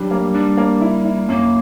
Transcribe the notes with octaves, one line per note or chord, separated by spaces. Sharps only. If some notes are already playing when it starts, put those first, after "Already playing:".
Already playing: F#3 G3 D4
A#3
G3 D4
A#3
E4
E4
F#2 A#3